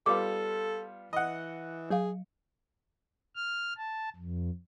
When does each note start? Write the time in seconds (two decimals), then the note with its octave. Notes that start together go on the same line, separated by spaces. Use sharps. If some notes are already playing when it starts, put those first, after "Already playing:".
0.06 G3 B3 F4 A4 D6
1.13 E3 D#5 F#5
1.91 F#3 G#4 F5
3.36 F6
3.77 A5
4.16 F2